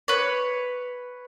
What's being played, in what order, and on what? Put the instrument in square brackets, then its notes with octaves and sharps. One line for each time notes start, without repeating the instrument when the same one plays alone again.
[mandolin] B4 C#5